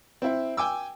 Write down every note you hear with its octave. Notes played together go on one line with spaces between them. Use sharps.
C4 E4
G5 G#5 D6 E6